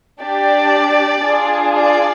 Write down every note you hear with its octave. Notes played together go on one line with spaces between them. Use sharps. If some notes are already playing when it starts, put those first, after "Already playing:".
D4 G4 D5
D4 F4 G#4
D5